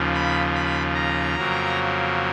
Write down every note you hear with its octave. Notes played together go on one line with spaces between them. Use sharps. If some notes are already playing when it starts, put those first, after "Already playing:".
Already playing: D#2 C#3 F3
B5
B5
A#5
F2 C#3 F#3 A#3